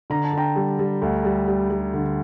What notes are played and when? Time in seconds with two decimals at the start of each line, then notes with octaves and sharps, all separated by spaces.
0.10 D3 A#5
0.24 A5
0.33 D3 G5 A#5
0.56 G3
0.79 G3
1.02 D2
1.25 G3
1.48 G3
1.70 G3
1.94 D3